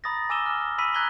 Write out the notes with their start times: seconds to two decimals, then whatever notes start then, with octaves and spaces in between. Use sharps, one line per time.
0.04 A#5 B5 D#6 A6 A#6
0.30 G#5 D6 E6 D#7 E7 G7
0.46 F6
0.78 B5 E6 B6 D#7
0.95 A#5 F#6 G#6 A#6 B6 G7